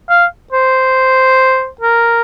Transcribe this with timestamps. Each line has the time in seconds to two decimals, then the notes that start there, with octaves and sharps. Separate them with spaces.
0.10 F5
0.52 C5
1.81 A#4